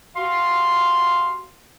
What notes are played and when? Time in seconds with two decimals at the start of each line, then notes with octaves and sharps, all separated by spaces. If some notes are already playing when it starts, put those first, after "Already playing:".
0.16 F#4 G4 F5 C6